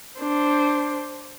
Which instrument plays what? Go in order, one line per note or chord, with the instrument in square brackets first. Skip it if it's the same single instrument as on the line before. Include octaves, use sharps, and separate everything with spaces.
[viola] D4 C5